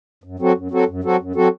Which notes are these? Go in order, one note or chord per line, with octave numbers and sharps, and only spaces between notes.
F#2
F#3 C4 F#4 A4
F#2
F#3 C4 F#4 A4
F#2
F#3 C4 F#4 A4
F#2
F#3 C4 F#4 A4